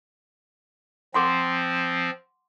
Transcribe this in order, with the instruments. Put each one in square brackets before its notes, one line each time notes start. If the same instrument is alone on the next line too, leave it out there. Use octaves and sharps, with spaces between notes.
[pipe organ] F3 C4 [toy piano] F#5 C6 D6